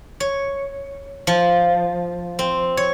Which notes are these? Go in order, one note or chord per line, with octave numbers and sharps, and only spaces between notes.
C#5
F3
C4
C#5